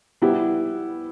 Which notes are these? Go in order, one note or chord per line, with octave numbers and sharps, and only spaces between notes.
G3 B3 E4 G4